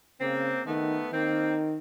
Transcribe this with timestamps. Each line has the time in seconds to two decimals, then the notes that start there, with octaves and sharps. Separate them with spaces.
0.20 C#3 A#3 C4
0.66 D#3 A3 B3
1.13 D#3 A#3 C4